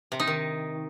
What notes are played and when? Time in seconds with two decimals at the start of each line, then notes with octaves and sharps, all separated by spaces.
0.12 C3
0.20 D#4
0.27 D#3